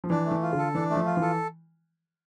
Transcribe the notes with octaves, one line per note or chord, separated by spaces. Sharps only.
F3
E3 D4
A3
E3
F4
D3
A4
E3 D4
A3
F3
F4
E3 A4